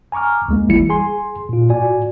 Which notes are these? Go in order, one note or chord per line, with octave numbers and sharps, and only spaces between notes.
G#5 A#5 C#6 D6 F6
D2 G#3 A#3
G1 E3 G3 E4 C#7
G#4 G#5 C6
A#2 F4
A2 F#4 D5 G#5